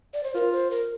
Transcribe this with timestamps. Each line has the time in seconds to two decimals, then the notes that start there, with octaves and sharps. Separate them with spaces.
0.14 D5
0.23 C5
0.35 F4 A#4
0.52 C5
0.71 A#4